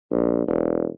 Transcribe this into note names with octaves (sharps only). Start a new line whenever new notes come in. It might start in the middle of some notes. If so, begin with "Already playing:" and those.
A#1
E1